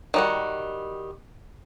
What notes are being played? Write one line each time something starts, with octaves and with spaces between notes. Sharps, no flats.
D#3 G3 F#4